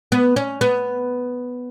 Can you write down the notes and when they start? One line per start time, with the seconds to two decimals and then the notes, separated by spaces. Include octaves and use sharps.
0.12 B3
0.36 C#4
0.61 B3